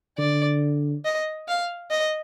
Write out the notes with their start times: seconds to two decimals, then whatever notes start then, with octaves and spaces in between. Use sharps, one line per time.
0.18 D3 D5
1.05 D#5
1.48 F5
1.91 D#5